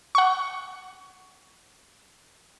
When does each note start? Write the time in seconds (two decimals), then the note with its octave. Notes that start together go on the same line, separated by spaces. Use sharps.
0.15 F#5 C#6